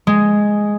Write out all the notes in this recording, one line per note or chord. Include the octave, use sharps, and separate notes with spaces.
G#3